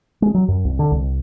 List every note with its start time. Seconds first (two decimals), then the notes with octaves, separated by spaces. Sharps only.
0.22 G#3
0.34 F#3
0.48 F#2
0.65 C2
0.79 D3
0.91 C2